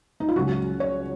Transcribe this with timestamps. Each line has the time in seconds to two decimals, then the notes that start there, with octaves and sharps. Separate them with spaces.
0.20 D#4
0.28 F4
0.36 C#2 C#3 F#3 F#4
0.80 C#5